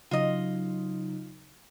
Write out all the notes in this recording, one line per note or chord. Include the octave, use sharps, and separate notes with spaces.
C#3 F#3 D#4 F4 D#5